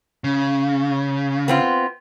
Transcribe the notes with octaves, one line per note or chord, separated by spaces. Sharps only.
C#3
B3 C4 F4